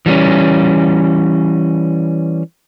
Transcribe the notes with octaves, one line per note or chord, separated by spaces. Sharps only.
E3 G3 A3 C#4